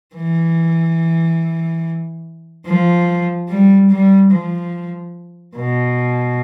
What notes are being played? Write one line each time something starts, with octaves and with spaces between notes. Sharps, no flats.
E3
F3
G3
G3
F3
B2